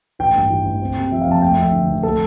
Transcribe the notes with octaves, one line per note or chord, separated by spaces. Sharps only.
A1 G5
G2
E3
A1
C4
C3
F3 E5
F5
F2 A5
A3 G5
E5
F2
E5
D3
F1
A3 A4